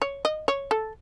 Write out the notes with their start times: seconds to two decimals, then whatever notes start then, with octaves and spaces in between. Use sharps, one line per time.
0.02 C#5
0.25 D#5
0.48 C#5
0.71 A4